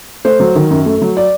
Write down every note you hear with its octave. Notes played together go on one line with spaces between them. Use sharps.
A3 C5
F#3
D#3
F#2
A3
F#3
D5